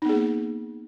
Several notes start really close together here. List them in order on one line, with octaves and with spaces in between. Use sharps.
D#4 B3 G#4 A#3